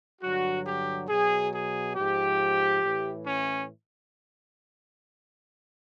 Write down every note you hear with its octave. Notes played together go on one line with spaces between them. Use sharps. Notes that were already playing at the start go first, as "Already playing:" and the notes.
G2 D3 F#3 F#4
G4
B2 F#3 G#4
G#4
G#2 F3 G4
A2 E3
C#4